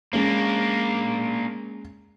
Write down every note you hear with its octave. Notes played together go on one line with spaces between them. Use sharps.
G#3 A#3 C#4 D4